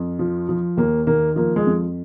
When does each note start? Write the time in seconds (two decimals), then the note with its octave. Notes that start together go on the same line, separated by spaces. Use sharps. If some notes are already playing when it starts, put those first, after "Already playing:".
Already playing: F2
0.19 F3
0.49 F3
0.77 D#2 A#3
1.07 D#3 A#3
1.36 F3 A#3
1.56 G#3
1.67 F2